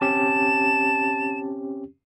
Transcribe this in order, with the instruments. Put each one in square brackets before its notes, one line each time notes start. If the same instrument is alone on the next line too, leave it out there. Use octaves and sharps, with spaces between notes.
[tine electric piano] C4 C#4 G4 [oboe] A5 [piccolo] E7